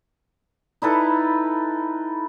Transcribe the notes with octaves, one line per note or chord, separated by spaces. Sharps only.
D#4 E4 A4 B4